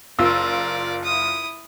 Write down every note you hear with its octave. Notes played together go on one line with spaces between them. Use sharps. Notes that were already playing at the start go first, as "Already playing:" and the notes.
F#1 F4 A#4 D5 E6
E4 D#6